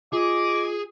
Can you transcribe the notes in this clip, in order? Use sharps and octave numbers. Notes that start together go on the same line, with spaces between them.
F4 G#4 D#5 D6